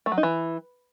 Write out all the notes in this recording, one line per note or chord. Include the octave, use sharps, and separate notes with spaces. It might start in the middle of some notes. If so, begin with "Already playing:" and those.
A3
F#3
D#4
E3